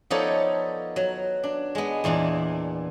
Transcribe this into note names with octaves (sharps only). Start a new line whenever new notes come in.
F3 B3 D#4 A4 C#5 D5
F#3
D4
G#3 B3
E2 A#2 E3 D4